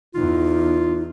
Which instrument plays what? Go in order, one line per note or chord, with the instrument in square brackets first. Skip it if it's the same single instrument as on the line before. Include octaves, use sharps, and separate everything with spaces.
[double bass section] E2 [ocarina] D#4 [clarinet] F4